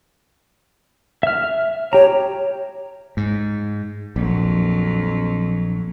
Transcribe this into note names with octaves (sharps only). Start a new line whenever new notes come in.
E5 F6
G4 C#5 A#5
G#2
A#1 F2 F#3